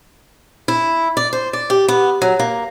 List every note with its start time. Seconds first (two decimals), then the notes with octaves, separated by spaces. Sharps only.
0.68 E4
1.17 D5
1.33 C5
1.53 D5
1.70 G4
1.88 B3
2.22 F#3
2.39 A#3